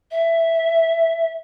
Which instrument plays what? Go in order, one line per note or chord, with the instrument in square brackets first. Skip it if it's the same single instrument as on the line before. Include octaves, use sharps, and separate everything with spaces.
[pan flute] E5